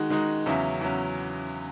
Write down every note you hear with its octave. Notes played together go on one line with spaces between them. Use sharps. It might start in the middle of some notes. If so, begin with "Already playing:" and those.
Already playing: D#3 G#3 D#4 F#4
D#3 G#3 D#4 F#4
E2 C#3 F#3 C#4 E4
E2 C#3 F#3 C#4 E4